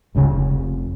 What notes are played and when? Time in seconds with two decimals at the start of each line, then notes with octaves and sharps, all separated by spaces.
0.15 F1 C#2 A2 C#3
0.31 F1